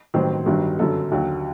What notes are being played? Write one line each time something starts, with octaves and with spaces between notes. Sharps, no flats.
A1 G2 D#3 F#3 C4 C5
G1 G2 D#3 F#3
G1 F#2 D3 F#3 A4
D#2 D3 F#3